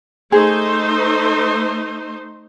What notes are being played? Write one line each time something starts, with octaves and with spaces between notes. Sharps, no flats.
A3 D#4 G#4 C5